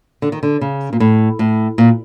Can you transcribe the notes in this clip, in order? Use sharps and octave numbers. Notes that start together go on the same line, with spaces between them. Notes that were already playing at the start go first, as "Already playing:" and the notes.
D3
D#3
D3
C#3
A#2
A2
A2
A#2